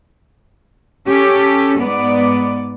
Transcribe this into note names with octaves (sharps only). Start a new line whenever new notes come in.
C#4 G4 A4
G#2 B3 D5